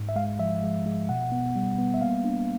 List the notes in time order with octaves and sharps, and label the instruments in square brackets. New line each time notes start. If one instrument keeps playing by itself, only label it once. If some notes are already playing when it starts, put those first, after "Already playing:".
Already playing: [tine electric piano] G#2
E5
G#3 F5
F3 E5
G#3
G#3
B2 F#5
B3
G3
B3
E5
A#3 F5
D4